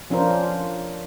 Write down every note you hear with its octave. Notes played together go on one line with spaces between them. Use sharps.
F3 C#4 D4 F4 A#4 C5